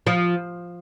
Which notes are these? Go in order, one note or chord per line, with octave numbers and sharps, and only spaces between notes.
F3